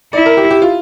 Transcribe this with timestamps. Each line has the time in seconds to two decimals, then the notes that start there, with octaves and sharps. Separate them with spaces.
0.13 E4 D5
0.26 A#4
0.37 G4
0.50 G4
0.62 F4